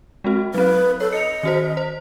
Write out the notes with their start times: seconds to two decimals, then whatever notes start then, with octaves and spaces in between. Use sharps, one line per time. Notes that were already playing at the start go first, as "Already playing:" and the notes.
0.24 G#3 C4 F#4
0.54 F#3 C4 B4
1.00 A4 C#5
1.12 D#5 C#7 F7
1.43 D#3 F#4 C5
1.77 C5